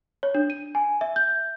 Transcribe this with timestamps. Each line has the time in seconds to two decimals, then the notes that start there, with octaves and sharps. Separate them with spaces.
0.23 C#5
0.35 D4
0.50 D#7
0.75 G#5
1.01 E5
1.16 G6